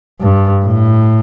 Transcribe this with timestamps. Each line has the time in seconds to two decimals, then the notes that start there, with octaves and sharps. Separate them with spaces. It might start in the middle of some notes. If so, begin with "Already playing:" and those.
0.20 G2
0.64 A2